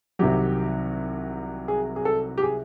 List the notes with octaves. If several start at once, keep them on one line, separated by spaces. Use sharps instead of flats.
C2 C3 D#3 F#3 G4
G#4
G#4
A4
G4
G#4